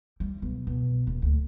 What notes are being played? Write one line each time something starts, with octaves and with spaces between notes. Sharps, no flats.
G3
B1
B2
D#1
D2